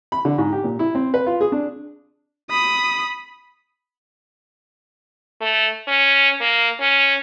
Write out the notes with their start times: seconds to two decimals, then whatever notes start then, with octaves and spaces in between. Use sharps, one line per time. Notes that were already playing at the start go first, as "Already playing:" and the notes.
0.12 B5
0.25 D3
0.38 G#2
0.52 G4
0.64 A#2
0.79 E4
0.95 C4
1.14 B4
1.26 F4
1.41 G#4
1.52 D4
2.50 B5 D#6
5.41 A3
5.88 C#4
6.41 A#3
6.80 C#4